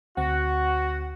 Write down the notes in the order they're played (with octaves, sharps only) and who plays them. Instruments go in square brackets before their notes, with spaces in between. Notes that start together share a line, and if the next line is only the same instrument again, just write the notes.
[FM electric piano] D2 C4 F#5 [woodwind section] F#4